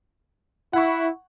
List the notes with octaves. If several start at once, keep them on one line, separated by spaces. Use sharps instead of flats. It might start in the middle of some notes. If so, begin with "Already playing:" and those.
E4 F#5 C#6